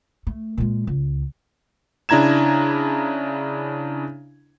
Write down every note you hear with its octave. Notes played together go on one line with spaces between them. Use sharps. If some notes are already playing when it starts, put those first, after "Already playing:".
A3
A#2 G#3
C#2
C#3 D4 E4 A#5 G#6 E7